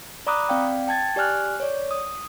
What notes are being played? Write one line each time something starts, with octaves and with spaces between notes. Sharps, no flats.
D5 A#5 B5 D6 D#6 F#6
C4 D5 F5 G5
G5 A5 G#6 A6
G4 D5 G#5 F6 F#6
C#5 D5
D#6